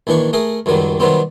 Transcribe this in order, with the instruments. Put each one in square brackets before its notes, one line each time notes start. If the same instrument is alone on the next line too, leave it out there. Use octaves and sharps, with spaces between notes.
[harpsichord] A#1 D#3 E3 D4 C#6
A3 G#4 A#4
C#2 F#2 D#3 F#3 G3
C3 D#3 F#3 G3 B3 C4